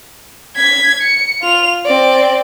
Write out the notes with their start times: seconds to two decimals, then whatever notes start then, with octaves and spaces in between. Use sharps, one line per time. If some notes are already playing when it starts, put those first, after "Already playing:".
0.56 G#6 B6
1.02 C#7
1.41 F4 F7
1.85 C4 D5